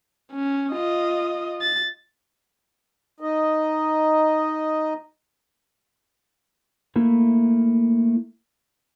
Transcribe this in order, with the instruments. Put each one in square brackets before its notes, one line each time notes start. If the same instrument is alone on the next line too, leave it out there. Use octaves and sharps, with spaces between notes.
[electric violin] C#4
F4 D#5
A6
[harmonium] D#4 D#5
[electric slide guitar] A3 A#3 E4